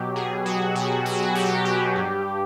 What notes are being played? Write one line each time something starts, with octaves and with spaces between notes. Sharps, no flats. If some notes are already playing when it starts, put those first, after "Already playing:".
Already playing: B2 F#3 G4
B2 G#4
F#3 F#4
B2 F#4
F#3 F#4
B2 G4
F#3
G2